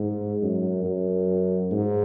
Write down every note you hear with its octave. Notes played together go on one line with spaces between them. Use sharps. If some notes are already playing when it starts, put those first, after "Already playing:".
Already playing: G#2
F#2
F#2
G#2